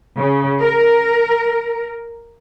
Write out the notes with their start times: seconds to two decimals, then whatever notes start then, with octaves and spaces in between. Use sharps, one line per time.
0.17 C#3
0.62 A#4